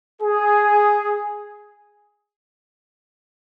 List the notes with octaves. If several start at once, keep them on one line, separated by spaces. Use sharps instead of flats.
G#4